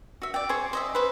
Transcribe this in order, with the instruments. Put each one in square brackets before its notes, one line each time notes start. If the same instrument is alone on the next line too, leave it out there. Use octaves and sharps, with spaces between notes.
[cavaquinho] F#4 E5
D5 G5
G#4 C5 C#5
C5 D#5 E5
B4 C5